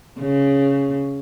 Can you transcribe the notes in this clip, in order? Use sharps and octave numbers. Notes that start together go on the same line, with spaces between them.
C#3